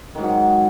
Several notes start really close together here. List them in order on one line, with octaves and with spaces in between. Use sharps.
D#3 G#2 F#3